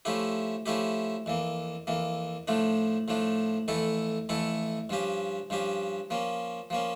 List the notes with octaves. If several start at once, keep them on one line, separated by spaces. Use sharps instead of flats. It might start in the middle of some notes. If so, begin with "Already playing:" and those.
F3 A3 C#4 E4 G4
F3 A3 C#4 E4 G4
F2 E3 A#3
F2 E3 A#3
A2 F3 A3 D4
A2 F3 A3 D4
F2 E3 A3 E4 A4
F2 E3 A3 E4 A4
G2 F3 C#4 G4
G2 F3 C#4 G4
F3 A#3 C#4
F3 A#3 C#4